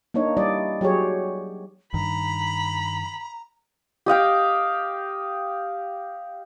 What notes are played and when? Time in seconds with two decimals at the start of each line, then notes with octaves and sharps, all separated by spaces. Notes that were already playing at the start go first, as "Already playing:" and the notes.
0.14 A#3 D4 D#4 C#5
0.37 G3 E4 D5 D#5
0.81 F#3 G4 G#4 C#5
1.94 G2 D#3 A#5 B5
4.06 G4 D#5 F5 G5